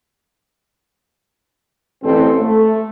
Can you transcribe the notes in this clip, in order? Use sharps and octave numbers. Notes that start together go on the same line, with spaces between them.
A1 C4 A4
A3